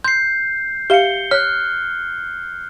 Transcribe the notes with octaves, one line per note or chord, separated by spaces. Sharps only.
C6 G6 C7
G4 E5 F5 C#7 G7
C#5 F6 F#6